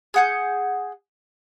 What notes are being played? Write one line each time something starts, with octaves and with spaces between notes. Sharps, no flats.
G#4 F#5 G6